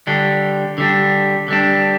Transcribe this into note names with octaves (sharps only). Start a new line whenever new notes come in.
D3 G3 D4
D3 G3 D4
D3 G3 D4